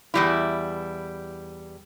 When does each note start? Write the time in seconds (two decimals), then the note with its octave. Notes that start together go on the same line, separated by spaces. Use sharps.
0.14 E2 G3 E4